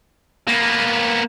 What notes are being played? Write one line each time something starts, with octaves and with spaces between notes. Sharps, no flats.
A#3 B3